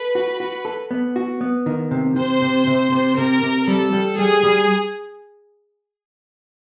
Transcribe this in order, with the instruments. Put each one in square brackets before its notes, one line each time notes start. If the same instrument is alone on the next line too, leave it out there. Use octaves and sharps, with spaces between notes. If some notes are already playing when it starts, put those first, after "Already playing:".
Already playing: [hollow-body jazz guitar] A4 [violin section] B4
[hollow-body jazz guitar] F#4
F#4
A4
B3
F#4
B3
D#3
C3
[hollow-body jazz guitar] C3 [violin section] C5
[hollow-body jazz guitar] C3
C3
C3
[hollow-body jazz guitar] C3 [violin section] A#4
[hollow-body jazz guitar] C3
[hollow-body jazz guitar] G3 [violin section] A4
[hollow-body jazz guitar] G3
[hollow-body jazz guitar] G3 [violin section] G#4
[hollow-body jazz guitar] G3